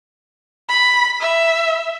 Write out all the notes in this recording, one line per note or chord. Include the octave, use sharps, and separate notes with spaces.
B5
E5